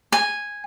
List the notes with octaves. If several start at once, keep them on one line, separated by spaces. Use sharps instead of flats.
G#5